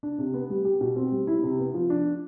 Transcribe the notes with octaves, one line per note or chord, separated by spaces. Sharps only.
D4
C3
B3
G3
G4
B2
C4
G3
E4
C3
B3
F3
D4